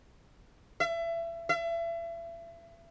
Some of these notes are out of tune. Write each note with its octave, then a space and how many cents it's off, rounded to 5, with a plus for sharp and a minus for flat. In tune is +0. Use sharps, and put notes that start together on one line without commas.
E5 +30
E5 +35